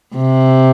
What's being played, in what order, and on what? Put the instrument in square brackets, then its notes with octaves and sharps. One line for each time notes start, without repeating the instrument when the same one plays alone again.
[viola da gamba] C3